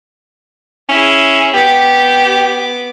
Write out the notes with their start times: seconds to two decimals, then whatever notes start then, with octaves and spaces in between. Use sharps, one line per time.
0.89 C#4 E4 G#4
1.54 B3 G4 D6